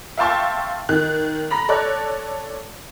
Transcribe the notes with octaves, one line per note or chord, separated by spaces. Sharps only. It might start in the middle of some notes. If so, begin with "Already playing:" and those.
E5 F5 G5 A5 C6 C#6
D#3 F#6
A#5 B5 A#6
A4 C#5 D5 F#6